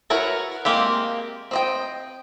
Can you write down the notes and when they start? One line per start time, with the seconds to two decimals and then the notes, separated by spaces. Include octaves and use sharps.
0.10 E4 F#4 A#4 B4 C#5
0.65 G#3 A#3 C4 G4
1.51 C4 D#5 G5